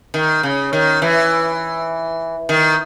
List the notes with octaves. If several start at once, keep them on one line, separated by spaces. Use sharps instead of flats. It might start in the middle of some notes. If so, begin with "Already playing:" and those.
D#3
C#3
D#3
E3
D#3